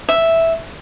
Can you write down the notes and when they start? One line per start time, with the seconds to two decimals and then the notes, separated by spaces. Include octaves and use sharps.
0.09 E5